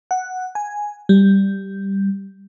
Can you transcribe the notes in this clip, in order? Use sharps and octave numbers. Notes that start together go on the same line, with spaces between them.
F#5
G#5
G3